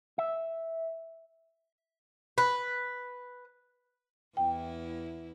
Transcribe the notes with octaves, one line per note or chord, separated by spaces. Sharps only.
E5
B4
E2 E4 G5